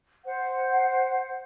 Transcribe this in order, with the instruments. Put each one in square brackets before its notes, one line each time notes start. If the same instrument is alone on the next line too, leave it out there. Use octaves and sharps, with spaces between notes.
[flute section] C5 F#5